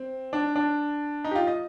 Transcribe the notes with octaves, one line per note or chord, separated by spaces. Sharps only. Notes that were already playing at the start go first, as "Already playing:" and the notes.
Already playing: C4
D4
D4
D#4
G4
F4
D#5